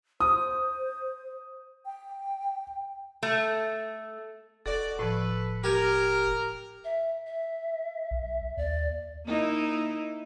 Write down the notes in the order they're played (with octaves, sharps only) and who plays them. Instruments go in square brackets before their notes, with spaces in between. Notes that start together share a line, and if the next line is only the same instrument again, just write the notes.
[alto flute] C5 [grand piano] D#6
[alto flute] G5
[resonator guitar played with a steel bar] A3
[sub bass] E1 [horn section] B2 F#4 D5 [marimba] A4
[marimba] A2 F3 [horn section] A4 B4
[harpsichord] G4 G#5 [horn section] A#4
[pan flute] E5
E5
[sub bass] B1
[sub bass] D#2 [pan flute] D5
[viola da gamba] A#3 D#4 E4